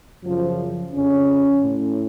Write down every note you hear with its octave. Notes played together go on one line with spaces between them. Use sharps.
F#2 C#3 F3
F2 C#3 C#4
A2